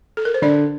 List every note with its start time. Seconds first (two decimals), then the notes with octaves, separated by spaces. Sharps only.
0.17 A4
0.25 A#4
0.34 C5
0.42 D3 D4 D5